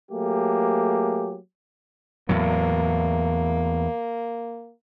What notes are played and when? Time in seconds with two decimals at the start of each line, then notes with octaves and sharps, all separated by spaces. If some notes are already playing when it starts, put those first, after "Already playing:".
0.12 F#3 A3 A#3 G4 G#4
2.29 E2 A2 F#3 A#3